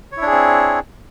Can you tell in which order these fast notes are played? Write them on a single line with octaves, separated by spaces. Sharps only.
C#5 E4 D4 G#4 C4